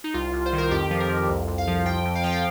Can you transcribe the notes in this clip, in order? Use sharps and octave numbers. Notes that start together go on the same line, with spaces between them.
D#4
C2 F4
C2
C5
D#3
A#4
F2 G4
F3
A#4
F2
C2
C2
F5
F3
F2 G5
F2
F5
F3 G5
F5